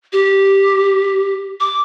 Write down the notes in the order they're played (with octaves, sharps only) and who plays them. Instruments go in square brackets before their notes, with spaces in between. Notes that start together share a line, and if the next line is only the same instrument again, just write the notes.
[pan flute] G4
D6